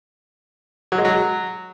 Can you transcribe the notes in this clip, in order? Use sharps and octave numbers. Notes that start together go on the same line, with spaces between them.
F#3
G#3
F#3